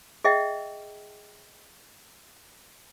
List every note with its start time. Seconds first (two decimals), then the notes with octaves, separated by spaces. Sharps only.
0.24 G#4 D#5 E5 G5